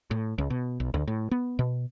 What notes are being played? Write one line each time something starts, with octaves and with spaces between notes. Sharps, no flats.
A2
C#2
B2
B1
D2
A2
B3
B2